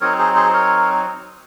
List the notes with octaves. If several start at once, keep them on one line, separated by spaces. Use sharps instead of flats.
F#3 C4 D#4 A#4 C#5
G#4 C5
G#4 C5
A#4 C#5